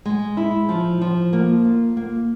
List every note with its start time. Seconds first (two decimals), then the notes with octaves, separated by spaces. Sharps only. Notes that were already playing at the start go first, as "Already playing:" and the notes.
0.05 G#3
0.37 E4
0.69 F3
1.01 F3
1.33 A#3
1.65 F4
1.97 A#3